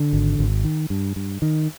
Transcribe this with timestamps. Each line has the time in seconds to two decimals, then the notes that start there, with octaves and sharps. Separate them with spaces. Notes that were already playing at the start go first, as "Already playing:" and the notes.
Already playing: D3
0.13 G#1
0.39 G#1
0.64 D#3
0.90 G2
1.16 G2
1.42 D#3